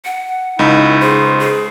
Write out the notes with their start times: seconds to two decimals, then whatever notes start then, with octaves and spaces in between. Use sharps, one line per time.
0.05 F#5
0.59 C#2 D#4 E4 B5
1.02 G#4 C5
1.40 G#4